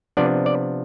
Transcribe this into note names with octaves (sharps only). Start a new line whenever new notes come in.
C3 F3 B3 D4 D5
D5